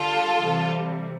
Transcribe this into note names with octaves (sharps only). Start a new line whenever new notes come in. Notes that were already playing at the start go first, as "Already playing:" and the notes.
Already playing: D3 G3 F4 A4
C3 E3 G3